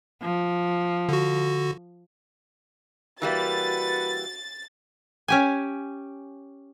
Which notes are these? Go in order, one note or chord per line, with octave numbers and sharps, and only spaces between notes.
F3
D3 F#4
E3 G3 A#3 F#4 B4 A6
C#4 G4 G#5